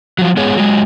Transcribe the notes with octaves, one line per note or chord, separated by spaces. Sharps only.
F3 F#3
G#3 B3 G#4 C#5
F#3 G#3